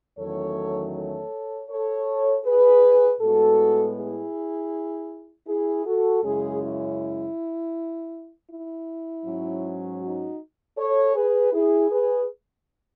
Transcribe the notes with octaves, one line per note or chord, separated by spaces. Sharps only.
E2 D#3 F#3 A3 C#4 A4 C#5
A4 C#5
A4 C#5
G#4 B4
A2 G#3 B3 F#4 A4
E4 G#4
E4 G#4
F#4 A4
F#2 C#3 G#3 C#4 E4 G#4
E4
E4
G#2 F#3 C#4
D#4 F#4
A4 C#5
G#4 B4
E4 G#4
G#4 B4